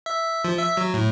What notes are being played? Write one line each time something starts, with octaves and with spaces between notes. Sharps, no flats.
E5
F3
E5
F#3
A2